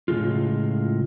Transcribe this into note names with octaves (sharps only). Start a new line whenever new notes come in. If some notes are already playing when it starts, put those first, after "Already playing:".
A2 C#3 G3 G#3 F4